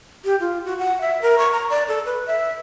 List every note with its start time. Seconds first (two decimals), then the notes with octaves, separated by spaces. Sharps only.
0.25 G4
0.40 F4
0.65 F#4
0.78 F#5
1.01 E5
1.22 A#4
1.38 C#6
1.52 A#5
1.70 D5
1.88 A4
2.06 B4
2.26 E5